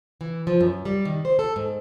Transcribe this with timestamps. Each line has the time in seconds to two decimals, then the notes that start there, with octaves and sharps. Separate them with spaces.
0.21 E3
0.47 F3
0.61 F#2
0.85 G3
1.05 D#3
1.25 C5
1.39 A4
1.56 G#2